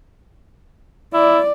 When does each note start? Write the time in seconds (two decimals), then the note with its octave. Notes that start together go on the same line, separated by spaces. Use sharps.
1.14 E4 D5